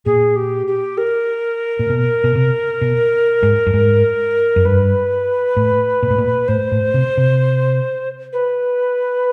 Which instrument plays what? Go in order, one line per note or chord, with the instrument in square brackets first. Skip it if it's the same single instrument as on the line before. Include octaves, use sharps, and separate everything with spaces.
[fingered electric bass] A#2 [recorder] G#4
[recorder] G4
G4
A#4
[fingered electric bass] A#2
B2
B2
C3
B2
G#2
G2
G#2
F#2
[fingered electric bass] G2 [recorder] B4
[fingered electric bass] A2
A#2
A2
A#2
[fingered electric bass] A2 [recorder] C5
[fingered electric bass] A2
C3
C3
[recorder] B4